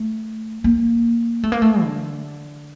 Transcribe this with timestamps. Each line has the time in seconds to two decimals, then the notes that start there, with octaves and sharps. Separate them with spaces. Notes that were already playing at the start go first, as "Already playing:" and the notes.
Already playing: A3
0.64 A#3
1.43 A3
1.52 A#3
1.62 A3
1.83 D3